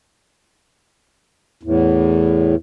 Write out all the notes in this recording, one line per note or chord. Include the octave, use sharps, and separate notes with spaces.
E2 A2